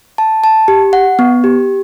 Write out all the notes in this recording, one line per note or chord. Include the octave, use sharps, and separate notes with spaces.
A5
A5
G4
F#5
B3
G4